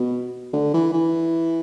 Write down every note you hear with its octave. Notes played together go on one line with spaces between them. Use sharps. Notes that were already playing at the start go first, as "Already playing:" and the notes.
Already playing: B2
D3
E3
E3